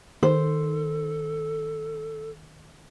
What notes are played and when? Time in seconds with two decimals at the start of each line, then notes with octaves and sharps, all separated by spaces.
0.23 D#3 A4 C5